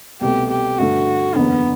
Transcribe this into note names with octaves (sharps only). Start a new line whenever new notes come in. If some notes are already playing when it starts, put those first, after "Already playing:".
C2 B2 A3 G4
G4
G2 D3 A3 F#4
F#1 E2 D3 B3